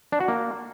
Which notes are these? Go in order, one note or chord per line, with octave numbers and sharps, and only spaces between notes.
D4
F#4
A#3